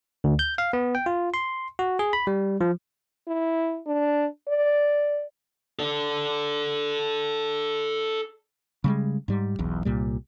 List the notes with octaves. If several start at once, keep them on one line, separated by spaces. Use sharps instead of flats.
D2
G6
F5
B3
G5
F4
C6
F#4
G#4
B5
G3
F3
E4
D4
D5
A4 D5
C#3 G3 G#3
G#2 G3
E1 B1 E2
C2 A#2 G3